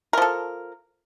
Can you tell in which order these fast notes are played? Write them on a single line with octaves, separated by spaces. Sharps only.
A#4 F3 A4